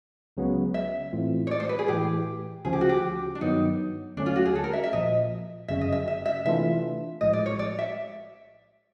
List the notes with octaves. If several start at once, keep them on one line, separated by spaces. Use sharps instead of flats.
C#2 C#3 F#3 B3
E5
A2 E3 A3 C4 F4
C#5
D5
C5
B4
G#4
A2 E3 A3 G4
D2 C#3 F3 G#4
G4
F#4
G4
D4
G2 D#3 F#3 B3 D#4
D#2 D3 F#3 A3 C#4 D4
F4
F#4
G#4
A4
A#4
E5
E5
A#1 A#2 F3 D#5
G1 F#2 C#3 E5
D#5
E5
E5
E5
C3 E3 A3 D4 F4 E5
A#1 A2 F3 G#3 D#5
D5
C#5
D5
E5